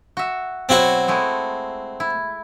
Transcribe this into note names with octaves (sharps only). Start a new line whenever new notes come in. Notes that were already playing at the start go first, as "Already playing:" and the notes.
F#4 E5
B2 F#3 C4 E4 F#4
G#3 A3 E4
E4